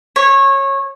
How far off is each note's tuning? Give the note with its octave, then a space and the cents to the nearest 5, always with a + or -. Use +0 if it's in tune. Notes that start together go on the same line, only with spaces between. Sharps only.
C#5 -20